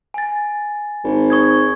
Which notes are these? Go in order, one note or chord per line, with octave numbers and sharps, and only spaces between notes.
G#5 A6
G#1
C#6 D#6 G#6